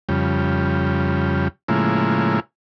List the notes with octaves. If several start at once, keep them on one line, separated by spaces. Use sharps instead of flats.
F2 C#3 G3
A2 C#3 F3 G#3 A#3 E4